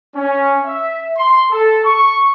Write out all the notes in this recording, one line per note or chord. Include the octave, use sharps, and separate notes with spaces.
C#4
E5
C6
A4
C#6